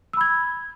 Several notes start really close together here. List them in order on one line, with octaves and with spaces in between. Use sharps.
E6 B5 G#6